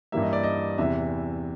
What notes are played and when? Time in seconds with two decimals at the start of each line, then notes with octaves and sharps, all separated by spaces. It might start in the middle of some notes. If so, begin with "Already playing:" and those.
0.12 G2 E3 G3 A#3 E5
0.22 D#5
0.33 D5
0.43 D#5
0.78 E2 C3 E3 E5